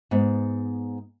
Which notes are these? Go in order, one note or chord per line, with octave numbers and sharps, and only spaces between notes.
G#2 B3